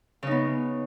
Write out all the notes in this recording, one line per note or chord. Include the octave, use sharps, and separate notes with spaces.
C#3 B3 D#4